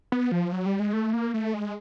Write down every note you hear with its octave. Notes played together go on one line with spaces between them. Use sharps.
B3
F3
F#3
G3
G#3
A3
A#3
A3
G#3